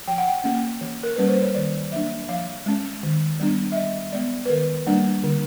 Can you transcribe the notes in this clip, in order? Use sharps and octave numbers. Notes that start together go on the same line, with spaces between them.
F3 G5
F#5
G5
A#3 C#4
E3
A#4
G3 A#3 C#4 B4
C5
C#5
D#3 D5
F#3 A#3 D4 E5
F3 F5
G#3 C#4
D#3
G3 B3 D4
E5
E3 D#5
G#3 B3 D5
B4
D#3 A#4
G3 A#3 D4
D3